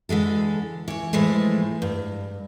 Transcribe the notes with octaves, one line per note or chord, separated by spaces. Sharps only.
D3 E3 G#3 A4
E3 C#5
A2 E3 F3 G#3 A3
G2